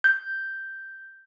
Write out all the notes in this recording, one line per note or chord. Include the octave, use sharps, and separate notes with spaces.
G6